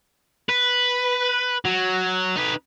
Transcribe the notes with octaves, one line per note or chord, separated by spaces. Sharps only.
B4
F#3
D#4 B4